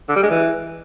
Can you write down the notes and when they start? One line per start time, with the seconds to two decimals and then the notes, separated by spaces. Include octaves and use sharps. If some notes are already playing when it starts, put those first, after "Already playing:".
0.09 D3
0.16 G3
0.23 G#3
0.30 E3